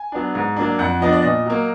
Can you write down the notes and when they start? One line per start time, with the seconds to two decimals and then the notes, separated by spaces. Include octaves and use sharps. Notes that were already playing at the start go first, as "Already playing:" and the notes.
Already playing: G#5
0.12 F#3 B3 D4
0.35 G#2
0.56 F#3 A#3 D4
0.79 F2 F#5
1.01 F3 B3 D4 D#5
1.12 D5
1.22 A#2 D#5
1.46 F#3 A#3